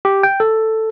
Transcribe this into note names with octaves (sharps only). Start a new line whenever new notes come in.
G4
G5
A4